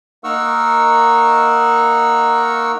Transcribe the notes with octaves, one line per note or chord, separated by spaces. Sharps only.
A#3 D#4 A#4 F#5 C#6 E6